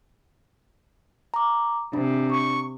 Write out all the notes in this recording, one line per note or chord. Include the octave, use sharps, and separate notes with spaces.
A#5 D6
C3 D4
C#6